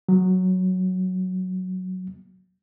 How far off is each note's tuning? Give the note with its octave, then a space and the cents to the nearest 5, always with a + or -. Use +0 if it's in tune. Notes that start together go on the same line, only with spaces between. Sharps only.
F#3 +0